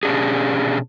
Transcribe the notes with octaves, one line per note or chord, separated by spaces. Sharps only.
B2 C#4 D4 G4 G#4